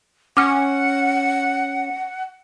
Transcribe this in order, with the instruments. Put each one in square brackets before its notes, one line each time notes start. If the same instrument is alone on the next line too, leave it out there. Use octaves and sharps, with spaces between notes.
[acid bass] C#4 [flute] F#5 [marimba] D6 F6